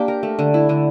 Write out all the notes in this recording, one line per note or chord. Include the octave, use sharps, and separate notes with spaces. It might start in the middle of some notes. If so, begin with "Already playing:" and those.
Already playing: A#3 D4 G4
A#4
A3
D3
E4
D3